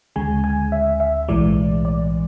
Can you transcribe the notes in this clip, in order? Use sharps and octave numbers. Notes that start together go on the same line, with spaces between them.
D2 C#3 G#3 G#5
G#5
E5
E5
B1 A2 E3 G#3 D5
D5